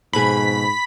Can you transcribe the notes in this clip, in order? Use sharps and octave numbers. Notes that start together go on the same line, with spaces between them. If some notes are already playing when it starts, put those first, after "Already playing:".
F2 G#2 B2 G#4 B5